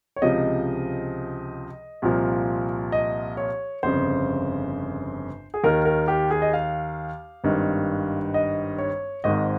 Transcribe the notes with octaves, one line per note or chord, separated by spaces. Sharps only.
C#5
C#2 C3 F3 D#5
C2 A#2 F3
D#5
C#5
G1 F2 C#3 C5
G#4
D#2 D#3 A#4
A#4
G4
G#4
D#5
F5
G#1 G2 D#3
D#5
C#5
G#1 G#2 D#3 D#5